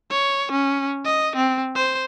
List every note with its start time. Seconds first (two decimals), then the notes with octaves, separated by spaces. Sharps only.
0.10 C#5
0.52 C#4
1.05 D#5
1.36 C4
1.76 C5